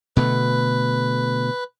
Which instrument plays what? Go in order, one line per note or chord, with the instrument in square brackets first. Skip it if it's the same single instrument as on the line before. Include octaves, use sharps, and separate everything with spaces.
[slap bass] B2 D3 A3 [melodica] B4